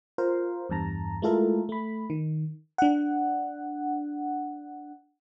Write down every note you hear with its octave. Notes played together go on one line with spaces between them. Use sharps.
F4 A#4 C5 F5
E2 G2 A5 A#5
G#3 A3 E4 F4 A4 A#4
A3 B5
D#3
D4 F#5